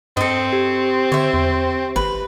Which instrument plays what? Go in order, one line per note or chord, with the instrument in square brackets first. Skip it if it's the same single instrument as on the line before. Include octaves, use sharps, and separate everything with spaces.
[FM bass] G2 [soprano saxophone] C4 [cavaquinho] A4 D#5
[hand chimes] G4
[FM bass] D3 [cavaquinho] C#5 E5
[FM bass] E2
[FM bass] G#1 [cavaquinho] B4